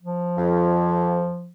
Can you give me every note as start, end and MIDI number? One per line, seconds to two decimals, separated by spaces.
0.03 1.52 53
0.37 1.27 41